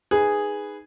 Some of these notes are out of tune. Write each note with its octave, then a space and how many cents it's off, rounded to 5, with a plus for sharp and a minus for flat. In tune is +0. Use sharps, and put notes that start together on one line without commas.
D#4 +0 G#4 -5 B4 +0